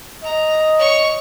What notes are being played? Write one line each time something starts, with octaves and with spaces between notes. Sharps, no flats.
D#5 A#5
C#5 C#6